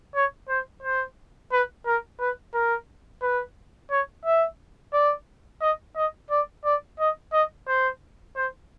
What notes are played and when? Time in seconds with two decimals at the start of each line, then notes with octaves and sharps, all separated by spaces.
0.15 C#5
0.49 C5
0.83 C5
1.52 B4
1.86 A#4
2.20 B4
2.54 A#4
3.22 B4
3.91 C#5
4.25 E5
4.93 D5
5.61 D#5
5.96 D#5
6.30 D5
6.65 D5
6.99 D#5
7.33 D#5
7.68 C5
8.36 C5